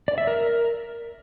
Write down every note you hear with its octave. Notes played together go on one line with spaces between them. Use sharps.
D5
E5
A#4